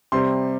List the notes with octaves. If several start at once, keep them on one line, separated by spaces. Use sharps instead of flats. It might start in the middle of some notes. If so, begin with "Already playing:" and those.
C3 G3 C4 C6